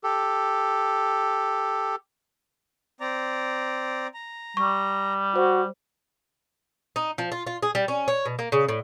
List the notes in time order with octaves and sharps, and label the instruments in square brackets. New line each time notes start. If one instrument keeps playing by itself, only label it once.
[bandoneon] G4 A4
[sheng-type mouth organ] C4 D5 A#5
A#5
[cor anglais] G3 [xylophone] C#6
[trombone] F#4 [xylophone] C5
[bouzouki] D#4
F3
F4
F4
G#4
G3
C#4
C#5
B2
A#3
C#3
A2